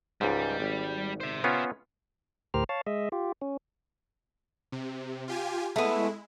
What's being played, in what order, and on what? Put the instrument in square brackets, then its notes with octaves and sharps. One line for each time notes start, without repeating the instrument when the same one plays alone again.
[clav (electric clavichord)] C#2 G#2 [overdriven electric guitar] G3
[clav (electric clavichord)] G#1
[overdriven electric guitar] C5 E5
[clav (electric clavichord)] B3 C#4 F4
[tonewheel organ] D2 A2 G4 A#4 C5 F6
C#5 F5 A5
G#3 D#5 E5
F4 G4
C#4
[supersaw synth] C3
F4 G4 G#5
[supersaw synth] G#3 E4 [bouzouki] A3 B3